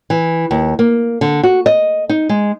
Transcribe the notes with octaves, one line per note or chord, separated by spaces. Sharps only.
E3
D#2
A#3
D3
F#4
D#5
D#4
G#3